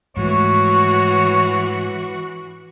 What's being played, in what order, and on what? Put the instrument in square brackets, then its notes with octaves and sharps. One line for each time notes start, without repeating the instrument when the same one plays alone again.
[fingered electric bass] G#2 F3 A3 [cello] E3 F#4 [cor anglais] C#5